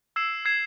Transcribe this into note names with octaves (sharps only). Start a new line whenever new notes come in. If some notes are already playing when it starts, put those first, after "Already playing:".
E6 G#6 C7 E7
E6 G#6 C7 E7